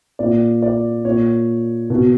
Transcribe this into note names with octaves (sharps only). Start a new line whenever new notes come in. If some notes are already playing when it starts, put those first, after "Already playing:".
A#2 D5
D5
A#2 C#5
B2